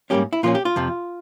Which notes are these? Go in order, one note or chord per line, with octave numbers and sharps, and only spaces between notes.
G#2 G3 A#3 C#4 G4
E4
A#2 F3 A#3 C#4 F4
G4
F4
F2 C3 F3